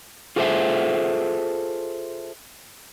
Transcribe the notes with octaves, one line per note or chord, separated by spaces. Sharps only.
F4 G#4 A4 C5 E5